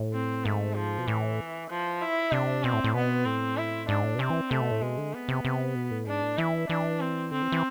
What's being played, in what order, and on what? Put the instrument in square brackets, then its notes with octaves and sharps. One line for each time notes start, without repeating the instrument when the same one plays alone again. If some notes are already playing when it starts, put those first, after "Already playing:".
Already playing: [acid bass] A2
[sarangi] C4
[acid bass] G#2 [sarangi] A3
[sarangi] F3
[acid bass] B2
[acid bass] A2 [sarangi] E3
[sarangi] F3
E4
[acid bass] C3 [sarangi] D4
[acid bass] B2 [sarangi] C4
[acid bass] A2
A2
[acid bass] B2 [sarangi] B3
[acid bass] A2 [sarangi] C4
[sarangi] E4
[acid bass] G#2 [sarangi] D4
[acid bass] A2
B2
[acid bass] C3 [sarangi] C4
[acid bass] E3
[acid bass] C3 [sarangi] A3
[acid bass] B2
A2
[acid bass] B2 [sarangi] G#3
[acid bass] D3
[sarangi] B3
[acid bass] C3
C3
B2
A2
[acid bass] G#2 [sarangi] D4
[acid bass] A2
[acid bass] E3 [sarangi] E4
[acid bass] E3 [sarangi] D4
[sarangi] C4
[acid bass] D3 [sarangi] C4
[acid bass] E3
E3